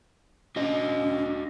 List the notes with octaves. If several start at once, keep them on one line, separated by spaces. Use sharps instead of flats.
C#4 D4 F#4 D#5